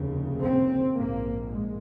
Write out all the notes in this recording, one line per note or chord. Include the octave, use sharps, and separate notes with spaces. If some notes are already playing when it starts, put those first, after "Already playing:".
Already playing: F1 D#2 C#3
C4
A#1 G#2 A#3
G#3